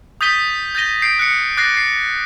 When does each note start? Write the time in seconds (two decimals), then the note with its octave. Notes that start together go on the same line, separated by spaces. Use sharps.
0.21 D#6 G6 A6 B6 D#7 G7
0.75 G6 A6 A#6 D#7 G7
1.02 G6 C7 D7
1.19 F#6 C#7
1.57 D6 F#6 A6 A#6 C7
1.74 A6 C7